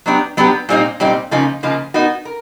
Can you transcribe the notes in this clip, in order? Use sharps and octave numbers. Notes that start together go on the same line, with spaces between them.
F#3 B3 D4 G4
F#3 B3 D4 G4
A#2 G3 C4 D#4
A#2 G3 C4 D#4
C#3 F3 A#3 D#4
C#3 F3 A#3 D#4
B3 D#4 F#4 A#4
A#4